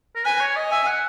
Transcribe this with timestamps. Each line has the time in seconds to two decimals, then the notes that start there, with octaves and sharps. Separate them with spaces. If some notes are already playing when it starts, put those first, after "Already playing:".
0.15 A#4
0.25 B4 G#5
0.40 C#5
0.56 D#5
0.71 E5 G#5
0.87 F#5